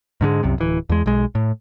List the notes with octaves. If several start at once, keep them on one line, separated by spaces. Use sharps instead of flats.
G#2 D3 D#3 G#3
C2 F#2 C3
D1 E3
E2 G#3
B1 G#3
A2